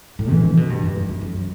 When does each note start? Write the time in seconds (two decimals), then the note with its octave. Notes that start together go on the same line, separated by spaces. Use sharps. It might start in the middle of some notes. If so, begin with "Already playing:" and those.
0.19 A2
0.32 E3
0.44 C3
0.57 B2
0.70 G2
0.83 F#2
0.96 F#2
1.09 F#2
1.21 F#2